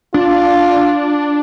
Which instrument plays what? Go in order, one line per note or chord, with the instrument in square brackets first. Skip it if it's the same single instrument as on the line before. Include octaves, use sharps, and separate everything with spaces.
[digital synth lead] D4 [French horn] F4